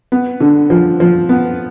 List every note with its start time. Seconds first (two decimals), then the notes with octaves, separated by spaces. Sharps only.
0.12 B3
0.40 D3
0.70 F3
1.00 F3
1.29 B3